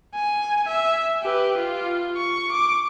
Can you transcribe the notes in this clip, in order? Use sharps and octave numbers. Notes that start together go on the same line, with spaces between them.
G#5
E5
G4 B4
F4
C#6
D6